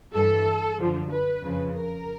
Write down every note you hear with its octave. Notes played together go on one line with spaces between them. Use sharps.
G2 E3 A4
F#2 D3 F3
B4
F2 C#3 F3
A#4